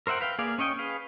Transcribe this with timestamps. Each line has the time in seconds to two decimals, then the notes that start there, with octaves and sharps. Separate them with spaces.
0.07 A#4 C5 E5 F#5 G5
0.21 B4 F5 G5
0.38 A#3 G#4 D5 F5
0.58 C#4 C#5 D#5 G5
0.79 G#4 B4 F5